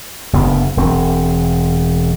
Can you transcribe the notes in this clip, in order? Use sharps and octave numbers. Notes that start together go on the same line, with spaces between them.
F#1 D2 B3
E1 C4